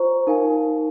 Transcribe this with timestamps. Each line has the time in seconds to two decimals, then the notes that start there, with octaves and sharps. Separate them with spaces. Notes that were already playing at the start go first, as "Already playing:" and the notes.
Already playing: F4 C5 A#5 C#6
0.27 D#4 A#4 F5 G#5